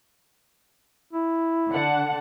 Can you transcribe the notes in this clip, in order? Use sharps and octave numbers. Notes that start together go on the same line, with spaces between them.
E4
D3 F#5 A5